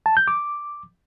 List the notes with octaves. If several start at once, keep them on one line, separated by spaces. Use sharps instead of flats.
A5
G6
D6